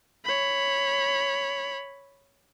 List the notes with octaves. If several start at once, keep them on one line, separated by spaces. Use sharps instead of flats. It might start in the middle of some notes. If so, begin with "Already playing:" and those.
C#5 B5